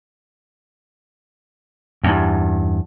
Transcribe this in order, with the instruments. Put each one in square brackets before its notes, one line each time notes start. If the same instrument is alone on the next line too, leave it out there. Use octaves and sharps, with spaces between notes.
[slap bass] E2 G2